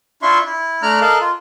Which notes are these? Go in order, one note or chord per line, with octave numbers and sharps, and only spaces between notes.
D4 E4 F4 E5 C6 C#6
E4
A3 D4 D5 A#5 F6 F#6
A4 A#4 D#5 F5 A5 F#6
F4